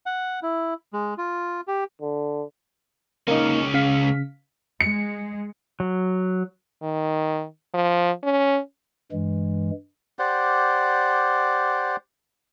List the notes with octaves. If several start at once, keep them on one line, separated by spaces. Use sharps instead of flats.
F#5
E4
G#3
F4
G4
D3
C#2 A#3 C#4 D#4
C#3 F5 B6
G#3 C#7
F#3
D#3
F3
C#4
G2 E3 G#3
G4 C5 D5 F#5